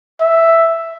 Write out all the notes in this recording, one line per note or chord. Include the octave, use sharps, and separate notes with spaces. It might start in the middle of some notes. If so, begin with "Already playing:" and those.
E5